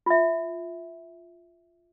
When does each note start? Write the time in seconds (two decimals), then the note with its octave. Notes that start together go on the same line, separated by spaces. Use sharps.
0.06 F4 E5